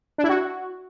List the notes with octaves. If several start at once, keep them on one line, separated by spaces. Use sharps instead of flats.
D4
E4
F#4